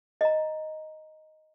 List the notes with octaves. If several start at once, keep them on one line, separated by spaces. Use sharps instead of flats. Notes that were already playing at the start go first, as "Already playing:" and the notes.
D#5 A#5